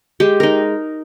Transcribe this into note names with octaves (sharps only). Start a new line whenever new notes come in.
G#3 G4
D#4 A#4